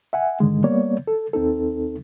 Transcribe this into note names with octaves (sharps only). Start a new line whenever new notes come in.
E5 F#5 G#5
G2 D3 D#3 G#3
G3 A#3 B3 C#5 D5
A4
D#2 C4 D#4 A4